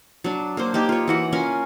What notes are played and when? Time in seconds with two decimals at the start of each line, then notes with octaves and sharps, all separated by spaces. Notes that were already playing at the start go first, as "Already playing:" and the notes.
0.24 F#3 D4
0.57 A#3 D4 C5
0.74 A#3 D#4 G4
0.89 F4 C#5
1.08 E3 F#4 F#5
1.33 C#4 F4 A#4 G#5